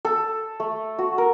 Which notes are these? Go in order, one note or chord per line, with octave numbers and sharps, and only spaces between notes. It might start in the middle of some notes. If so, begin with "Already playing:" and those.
A4
A3
F#4
A#4